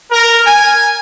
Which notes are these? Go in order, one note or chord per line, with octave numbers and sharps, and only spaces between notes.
A#4
G#5